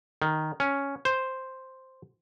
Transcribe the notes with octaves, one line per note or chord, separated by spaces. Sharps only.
D#3
C#4
C5